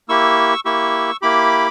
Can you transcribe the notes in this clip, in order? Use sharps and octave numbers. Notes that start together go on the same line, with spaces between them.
A#3 E4 G4 C#6 E6
A#3 E4 G4 C#6 E6
A#3 E4 G4 B5 D6